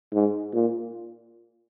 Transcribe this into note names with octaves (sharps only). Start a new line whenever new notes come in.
G#2
A#2